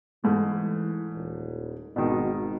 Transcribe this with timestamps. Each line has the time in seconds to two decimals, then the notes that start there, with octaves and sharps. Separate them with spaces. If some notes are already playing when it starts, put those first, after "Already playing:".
0.24 G#2 E3 A3
1.12 D#1
1.96 G#1 B2 D#3